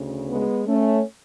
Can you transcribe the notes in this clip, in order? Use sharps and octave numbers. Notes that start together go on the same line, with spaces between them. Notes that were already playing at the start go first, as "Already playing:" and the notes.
Already playing: D2 C#3
G#3 B3
A3 C#4